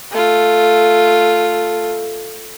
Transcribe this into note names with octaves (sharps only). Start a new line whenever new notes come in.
A3 F4